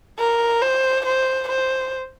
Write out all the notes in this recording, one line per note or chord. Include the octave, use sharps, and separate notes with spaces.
A#4
C5
C5
C5